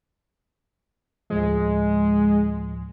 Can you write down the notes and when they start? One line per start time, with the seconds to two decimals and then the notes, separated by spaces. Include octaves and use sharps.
1.30 D2 A2 F3 G#3